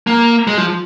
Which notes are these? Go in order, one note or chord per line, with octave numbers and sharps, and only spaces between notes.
A#3
G#3
F3